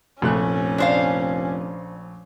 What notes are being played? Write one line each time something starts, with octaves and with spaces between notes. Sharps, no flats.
F1 A#1 A3 C#4 F#6
D4 C5 F5